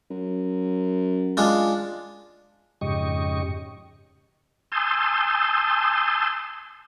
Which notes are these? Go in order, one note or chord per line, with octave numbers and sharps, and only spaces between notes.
F#2
G#3 D4 F4
F2 G#2 C#3 G4 D#5 C#6
G#5 A5 C6 D#6 E6 G6